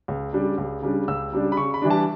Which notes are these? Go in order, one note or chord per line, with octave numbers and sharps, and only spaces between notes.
C#2
C#3 G3 D4
C#2
C#3 G3 D4
C#2 E6
C#3 G3 D4
B5
C#3 C#6
B5
E3 G3 D4
A5